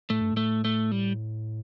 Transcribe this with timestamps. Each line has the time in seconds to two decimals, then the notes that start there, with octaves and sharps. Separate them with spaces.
0.10 A2 A3
0.20 G2
0.33 A2 A3
0.65 A3
0.91 G3